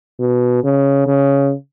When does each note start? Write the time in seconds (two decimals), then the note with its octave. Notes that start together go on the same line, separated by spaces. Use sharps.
0.20 B2
0.64 C#3
1.07 C#3